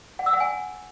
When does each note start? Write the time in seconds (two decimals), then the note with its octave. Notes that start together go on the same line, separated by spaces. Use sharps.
0.19 F#5
0.26 E6
0.33 F#5
0.40 G#5